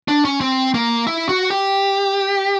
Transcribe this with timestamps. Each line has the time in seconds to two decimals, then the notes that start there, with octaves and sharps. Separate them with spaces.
0.08 D4
0.25 C#4
0.41 C4
0.74 A#3
1.07 E4
1.29 F#4
1.50 G4